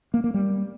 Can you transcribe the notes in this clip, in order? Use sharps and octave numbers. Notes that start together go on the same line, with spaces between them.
A#3
A#3
G3